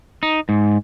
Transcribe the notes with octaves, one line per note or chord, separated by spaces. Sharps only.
D#4
G#2